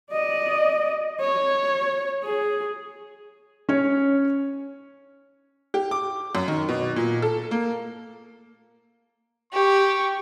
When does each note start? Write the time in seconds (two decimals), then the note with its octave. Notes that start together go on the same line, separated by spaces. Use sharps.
0.11 D5 D#5
1.21 C#5
2.24 G#4
3.69 C#4 C#5
5.74 G4
5.91 D6
6.35 F#2
6.48 D#3
6.68 B2
6.96 A#2
7.22 A4
7.51 A#3
9.53 G4 C#6